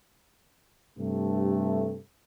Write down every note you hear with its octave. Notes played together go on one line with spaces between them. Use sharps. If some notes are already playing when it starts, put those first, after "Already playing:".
G2 C3 A3